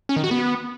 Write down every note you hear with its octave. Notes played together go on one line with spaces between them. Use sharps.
C#4
D#3
F#4
B3